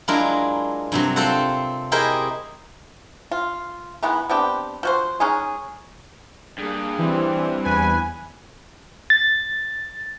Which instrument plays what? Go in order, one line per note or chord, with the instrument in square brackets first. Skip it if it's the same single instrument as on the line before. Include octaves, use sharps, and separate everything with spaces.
[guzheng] F#3 G#3 D4 E4 F4 A#4
G2 C3 F#3
C4 F4 A4 C5 F#5
E4 G4 G#4 A#4 C5 D#5
[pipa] F4
D#3 E3 G#3 B3
B3 C4 D4 G4
F3 F#4 C5
G#3 C#4 D#4 G#4
[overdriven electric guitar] G2 [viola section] A#3 G#4
[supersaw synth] E3 [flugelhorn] G3 [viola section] C4
[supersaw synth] E2 G#5 [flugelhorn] B4
[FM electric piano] A6